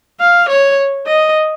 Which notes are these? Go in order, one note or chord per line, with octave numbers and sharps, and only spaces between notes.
F5
C#5
D#5